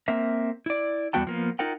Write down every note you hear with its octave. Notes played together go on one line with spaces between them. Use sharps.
A#3 C4 A#4 E5
E4 D5
E2 G3 B3 F#4 G5 A5
F3 A#3 B3
D#4 F4 A#4 F#5 G5